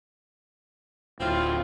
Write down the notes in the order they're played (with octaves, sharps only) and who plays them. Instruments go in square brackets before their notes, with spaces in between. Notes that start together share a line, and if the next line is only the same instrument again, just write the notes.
[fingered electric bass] D1 [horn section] C4 E4 F4